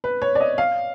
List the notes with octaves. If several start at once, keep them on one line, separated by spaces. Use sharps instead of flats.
B4
C#5
D5
D#5
F5